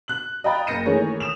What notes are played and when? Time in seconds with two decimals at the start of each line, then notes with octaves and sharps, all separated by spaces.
0.08 F#6 F#7
0.44 D#5 F5 G5 A#5 B5 A6
0.67 F#1 G6 A#6 C#7 D#7
0.86 D#3 E3 A3 G#4 A#4 C#5
1.20 D#6 E7 F7